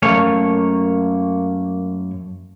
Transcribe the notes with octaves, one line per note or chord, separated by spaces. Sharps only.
F#2 A3 A#3 C#5